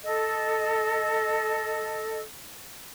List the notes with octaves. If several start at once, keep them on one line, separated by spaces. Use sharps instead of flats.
A4 D#5